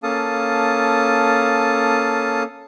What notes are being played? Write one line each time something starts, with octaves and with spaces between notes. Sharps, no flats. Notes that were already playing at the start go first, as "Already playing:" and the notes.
A#3 C#4 A4 F5 A5 D#6